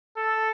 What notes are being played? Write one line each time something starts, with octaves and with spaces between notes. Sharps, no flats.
A4